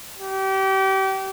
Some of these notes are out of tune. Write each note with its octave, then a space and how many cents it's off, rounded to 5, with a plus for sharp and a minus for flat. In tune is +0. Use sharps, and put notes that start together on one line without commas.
G4 -30